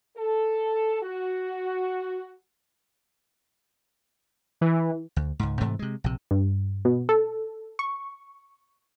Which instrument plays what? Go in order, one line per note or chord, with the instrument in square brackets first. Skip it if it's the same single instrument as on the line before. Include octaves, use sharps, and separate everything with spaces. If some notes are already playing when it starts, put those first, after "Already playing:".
[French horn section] A4
F#4
[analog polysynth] E3
[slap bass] D2
C#2 G#2
G#2 C3 E3 A3
C3 G#3
A#1 C3
[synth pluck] G2
B2
A4
C#6